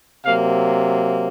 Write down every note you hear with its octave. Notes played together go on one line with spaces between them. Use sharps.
C3 F#3 A#3 F5